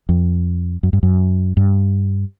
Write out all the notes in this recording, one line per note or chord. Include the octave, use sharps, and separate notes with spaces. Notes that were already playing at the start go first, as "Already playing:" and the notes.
F2
F#2
G2
F#2
G2